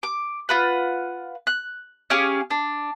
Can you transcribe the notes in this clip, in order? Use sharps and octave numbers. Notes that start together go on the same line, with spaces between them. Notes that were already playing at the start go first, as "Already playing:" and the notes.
D6
F4 B4 F#5
F#6
C#4 G4 G#4 F5
D4